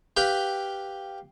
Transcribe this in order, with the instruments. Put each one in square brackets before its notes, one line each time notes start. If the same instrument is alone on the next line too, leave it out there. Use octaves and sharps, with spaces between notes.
[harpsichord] G4 B4 F5 G5